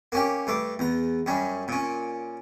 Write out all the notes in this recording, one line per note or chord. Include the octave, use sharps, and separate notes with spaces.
A#3 C#4 G4
G2 A3 D6
E2 A#5
F#2 G3 C#4
A#2 C#4